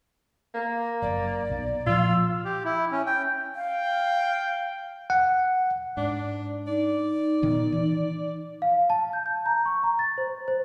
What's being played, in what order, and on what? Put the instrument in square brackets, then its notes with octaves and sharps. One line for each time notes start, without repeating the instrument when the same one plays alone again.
[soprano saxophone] A#3
[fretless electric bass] F#1 [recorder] D5
[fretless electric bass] B1
[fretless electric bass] A#2 F3 [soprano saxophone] F4 [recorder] E6
[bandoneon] G4
E4
C#4
G5
[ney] F5 [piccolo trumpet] G5
[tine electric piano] F#5
[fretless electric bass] G#2 [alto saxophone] D4
[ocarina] D#4 [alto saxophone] D5
[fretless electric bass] A#2 D#3 B3
E3
[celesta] F5
A5
G6
G6
A#5
C#6
A#5
A6
C5
C5